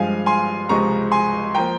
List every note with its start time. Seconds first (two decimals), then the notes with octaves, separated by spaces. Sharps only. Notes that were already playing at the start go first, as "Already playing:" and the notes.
Already playing: G2 F3 G#3 F5 G#5
0.26 G#5 C6
0.69 C#2 C3 F3 G#3 A#5 C#6
1.12 G#5 C6
1.55 F3 A#3 G5 A#5